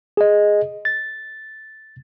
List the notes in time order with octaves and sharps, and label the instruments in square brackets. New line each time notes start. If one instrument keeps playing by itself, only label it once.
[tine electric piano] G#4 D#5
A6